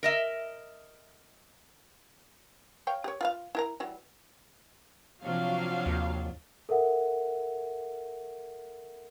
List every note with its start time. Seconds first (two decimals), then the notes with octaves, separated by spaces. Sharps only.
0.03 A#4 D#5 E5
2.87 C#5 F5 G5
3.04 G4 C#5
3.21 F4 B4 F5
3.55 E4 A#4 A#5
3.80 E3 F#3 G3
5.23 C3 F3 F#3 D4 F5
5.86 D#2
6.69 A4 A#4 E5 F#5